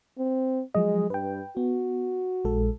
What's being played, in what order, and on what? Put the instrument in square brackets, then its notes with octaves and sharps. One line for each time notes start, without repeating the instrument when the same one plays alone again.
[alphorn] C4
[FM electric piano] F3 F#3 D#5 [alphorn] G#3
[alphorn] G2 [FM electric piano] B4 G5
[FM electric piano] B3 [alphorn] F#4
[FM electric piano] A#1 G#3 A4